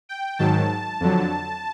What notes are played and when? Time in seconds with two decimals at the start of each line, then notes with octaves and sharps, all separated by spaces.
0.09 G5
0.39 G#2 D#3 F#3 A5
1.00 F2 D3 F#3